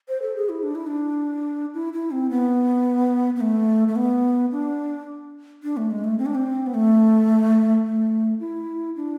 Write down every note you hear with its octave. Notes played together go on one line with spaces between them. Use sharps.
C5
A4
G#4
E4
D4
E4
D4
E4
E4
C4
B3
B3
A3
A3
B3
D4
D4
A3
G#3
A3
C4
D4
C4
B3
A3
A3
E4
D4